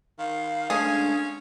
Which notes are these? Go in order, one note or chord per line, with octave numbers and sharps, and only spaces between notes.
D#3 F5
G#3 A3 C#4 D4 G#4